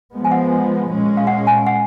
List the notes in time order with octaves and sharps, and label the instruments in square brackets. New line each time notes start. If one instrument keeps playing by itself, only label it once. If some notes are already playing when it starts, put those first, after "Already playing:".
[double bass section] F3 G#3 B3
[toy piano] G#5
F#5
[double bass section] A#2 G#3 C#4
[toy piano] F5
F#5
G#5
F#5